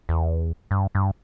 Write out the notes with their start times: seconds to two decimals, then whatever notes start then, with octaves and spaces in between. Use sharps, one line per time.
0.09 E2
0.71 G2
0.95 G2